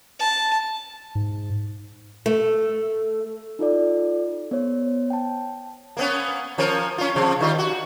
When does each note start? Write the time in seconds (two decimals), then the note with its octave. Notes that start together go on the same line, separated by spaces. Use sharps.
0.19 A5
1.15 G#2
2.26 A3
3.59 D#4 F4 A4 D5
4.51 B3 C5 C#5
5.10 G5 A5
5.97 A#3 B3 C#4
6.58 F3 C#4 A#4
6.98 C#4 F4
7.16 C3 F3
7.41 D#3 G3 F4
7.58 F#4